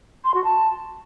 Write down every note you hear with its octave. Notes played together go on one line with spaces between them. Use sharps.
C6
F#4
A5